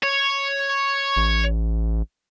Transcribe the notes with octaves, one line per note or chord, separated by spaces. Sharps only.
C#5
A1